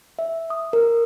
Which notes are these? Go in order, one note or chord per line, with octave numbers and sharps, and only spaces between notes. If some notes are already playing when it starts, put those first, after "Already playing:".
E5
D#6
A#4